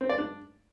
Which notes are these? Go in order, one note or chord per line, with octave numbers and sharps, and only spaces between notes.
C4
D5
D4